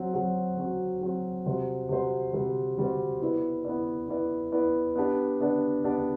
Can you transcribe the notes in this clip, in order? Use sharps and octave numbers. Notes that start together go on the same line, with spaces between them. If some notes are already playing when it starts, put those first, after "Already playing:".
Already playing: F#3 C4 F#4
F#3 C4 F#4
F#3 C4 F#4
F#3 C4 F#4
C3 G3 C4 F#4 C5
C3 G3 C4 F#4 C5
C3 G3 C4 F#4 C5
C3 G3 C4 F#4 C5
B3 E4 B4 D5
B3 E4 B4 D5
B3 E4 B4 D5
B3 E4 B4 D5
B3 D4 G4 D5
B3 D4 G4 D5
B3 D4 G4 D5